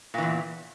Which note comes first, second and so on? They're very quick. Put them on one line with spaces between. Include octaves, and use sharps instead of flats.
A#2 E3 E2